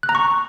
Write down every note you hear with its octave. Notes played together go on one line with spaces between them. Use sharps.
F#6
A#5
C#6